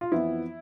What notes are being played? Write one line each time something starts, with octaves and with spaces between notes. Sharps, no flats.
F4
F2 E3 B3 E4